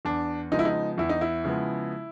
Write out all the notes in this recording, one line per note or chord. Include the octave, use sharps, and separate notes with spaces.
E2 D4
C#3 F3 G#3 B3 D#4
E4
D#4
E2 E4
D#4
E4
C#3 F3 G#3 B3